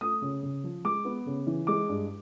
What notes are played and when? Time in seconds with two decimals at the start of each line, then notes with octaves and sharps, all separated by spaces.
0.01 A3 D#6
0.22 C#3
0.43 C#3
0.64 F3
0.85 G#3 D6
1.05 B3
1.26 C#3
1.47 E3
1.67 G#3 D6
1.89 G2